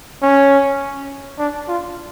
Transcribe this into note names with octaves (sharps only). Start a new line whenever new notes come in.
C#4
D4
F4